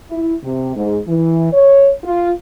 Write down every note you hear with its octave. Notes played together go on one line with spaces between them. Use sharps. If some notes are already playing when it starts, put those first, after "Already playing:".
E4
C3
G#2
E3
C#5
F4